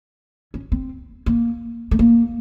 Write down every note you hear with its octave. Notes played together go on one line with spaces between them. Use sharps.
C#4
C4
A#3
A3
A#3